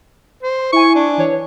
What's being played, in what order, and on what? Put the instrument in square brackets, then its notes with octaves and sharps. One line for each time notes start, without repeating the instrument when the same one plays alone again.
[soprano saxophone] C5
[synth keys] E4 G#5 [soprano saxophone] C#6
[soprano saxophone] D4
[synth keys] E3 C#5